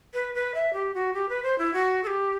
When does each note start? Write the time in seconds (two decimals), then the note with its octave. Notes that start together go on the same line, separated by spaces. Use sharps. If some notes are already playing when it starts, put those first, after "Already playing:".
0.14 B4
0.35 B4
0.55 E5
0.73 G4
0.94 F#4
1.14 G4
1.29 B4
1.43 C5
1.58 E4
1.73 F#4
2.04 A4
2.07 G4